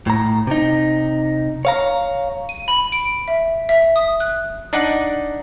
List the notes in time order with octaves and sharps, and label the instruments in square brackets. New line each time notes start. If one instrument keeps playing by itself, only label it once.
[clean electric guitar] A2 A#5
C3 D#4
C#5 F5 A#5
[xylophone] D#7
B5
D7
E5
E5
D#6
F#6
[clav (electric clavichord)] D4 D#4 D5 F#5